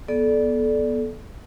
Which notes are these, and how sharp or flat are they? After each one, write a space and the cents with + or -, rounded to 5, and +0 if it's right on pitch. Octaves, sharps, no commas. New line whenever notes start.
B3 -20 A4 -25 D5 +0